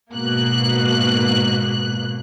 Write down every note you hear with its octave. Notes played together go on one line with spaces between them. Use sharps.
G#2 B2 A#3 F#6